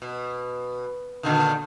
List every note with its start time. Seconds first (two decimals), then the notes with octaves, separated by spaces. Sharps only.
0.02 B2
1.23 A#2 D3 D#3